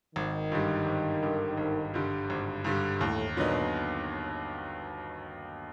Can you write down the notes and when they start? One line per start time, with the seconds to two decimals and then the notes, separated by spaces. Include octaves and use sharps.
0.16 G#1 D#3
0.52 G2 D3 G3
0.86 G#1
1.22 G2 D3 G3
1.57 G#1
1.94 G2 D3 G3
2.30 G#1
2.64 G2 D3 G3
3.01 D#2 A2
3.36 A#2 D3 F#3 B3 D#4